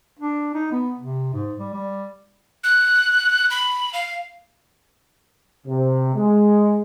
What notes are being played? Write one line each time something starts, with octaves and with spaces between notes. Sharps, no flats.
D4
D#4
B3
C3
G#2
G3
G3
F#6
B5
F5
C3
G#3